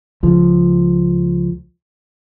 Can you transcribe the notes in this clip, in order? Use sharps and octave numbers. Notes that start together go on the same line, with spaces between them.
C#2 F3